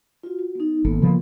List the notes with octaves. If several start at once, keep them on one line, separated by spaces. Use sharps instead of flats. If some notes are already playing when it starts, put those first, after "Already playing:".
F4 F#4
F#4
B3 D#4
G#1 A#3 B3 A4
C#3 F3 A#3 B5